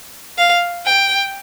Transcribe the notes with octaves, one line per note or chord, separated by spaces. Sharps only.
F5
G5